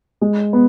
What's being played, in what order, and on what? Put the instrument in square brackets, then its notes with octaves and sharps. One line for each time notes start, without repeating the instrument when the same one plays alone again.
[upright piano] G#3
B3